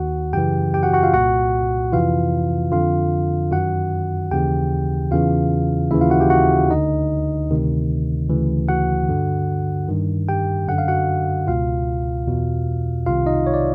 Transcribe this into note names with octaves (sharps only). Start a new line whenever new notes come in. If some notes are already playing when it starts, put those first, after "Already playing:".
Already playing: D#2 D#3 F#4 F#5
F#2 C#3 E3 G4 G5
G4 G5
F#4 F#5
F#4 F#5
F4 F5
C2 A#2 F#4 F#5
F2 C3 E3 F4 F5
F2 D3 F4 F5
F#2 D#3 F#4 F#5
D#2 C#3 E3 G4 G5
E2 C#3 E3 F4 F5
D#2 C#3 E3 E4 E5
F4 F5
F#4 F#5
G4 G5
F#4 F#5
D2 D3 D#4 D#5
D2 C3 D#3
D2 C#3 E3
F#4 F#5
G2 D3
G2 D#3
G4 G5
F#2 D3 F#5
F5
F#4 F#5
C#2 B2 F4 F5
E2 B2
C2 C3 D#3 F4 F5
D#4 D#5
C#5
D5